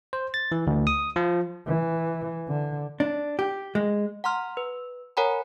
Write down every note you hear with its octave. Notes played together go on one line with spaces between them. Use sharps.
C5
A6
E3
D2
D#6
F3
E3
D3
D4
G4
G#3
F#5 A#5 C6 F6
B4
A#4 C#5 F#5 G#5 A#5 B5